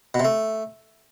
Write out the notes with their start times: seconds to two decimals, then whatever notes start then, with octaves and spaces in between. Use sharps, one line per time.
0.14 B2
0.20 C3
0.25 A3